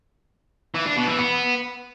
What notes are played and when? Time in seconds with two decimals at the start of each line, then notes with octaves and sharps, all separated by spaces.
0.74 E3
0.85 D4
0.96 B2
1.07 E3
1.18 B3